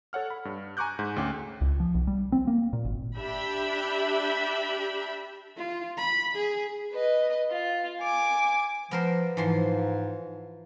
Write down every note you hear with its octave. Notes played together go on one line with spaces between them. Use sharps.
A4 C#5 F#5 F6
B5
G2
G#5 A#5 C#6 D6 F#6 G6
G#2
D2 C#4 G5 D6
C#2
F3
B1
G3
C4
A#3
A#2
G#1
D4 G4 E5 B5
F4
B5
G#4
B4 D#5
F4
G#5 D6
F3 B3 A#4 C5
G#2 E3 F3 C6